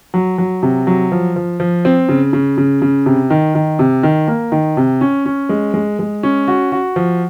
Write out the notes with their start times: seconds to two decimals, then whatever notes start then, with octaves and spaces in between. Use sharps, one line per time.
0.14 F#3
0.38 F#3
0.63 C3
0.87 F#3
1.12 F3
1.36 F3
1.60 F3
1.85 C4
2.09 C#3
2.33 C#3
2.58 C#3
2.82 C#3
3.06 C3
3.30 D#3
3.55 D#3
3.79 C3
4.03 D#3
4.28 A#3
4.52 D#3
4.77 C3
5.01 C#4
5.26 C#4
5.49 G#3
5.74 G#3
5.99 G#3
6.23 C#4
6.48 F#4
6.72 F#4
6.96 F3